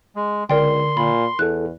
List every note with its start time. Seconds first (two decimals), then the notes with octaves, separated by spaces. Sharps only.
0.16 G#3
0.50 C#2 D3 A#4 D5 G5 C6
0.97 A#2 B5
1.39 E2 E4 A4 F#6